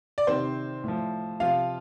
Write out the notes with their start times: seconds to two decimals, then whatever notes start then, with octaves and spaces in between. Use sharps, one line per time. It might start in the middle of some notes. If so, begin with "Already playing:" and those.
0.18 D5
0.27 C3 D#3 C4 C5
0.84 A2 F3
1.40 C3 F3 F4 F5